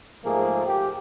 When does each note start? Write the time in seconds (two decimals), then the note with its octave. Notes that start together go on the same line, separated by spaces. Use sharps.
0.25 G#2 F3 A3 A#3 G#4
0.66 G4